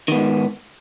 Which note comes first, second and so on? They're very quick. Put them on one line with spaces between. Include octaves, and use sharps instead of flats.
D#3 B3 G#2